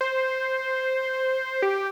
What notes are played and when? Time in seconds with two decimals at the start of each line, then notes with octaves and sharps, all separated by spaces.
0.01 C5
1.62 G4